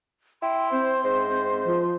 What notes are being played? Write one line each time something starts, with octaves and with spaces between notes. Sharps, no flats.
E4 G5 C6
C4 C5
G#2 C5
F3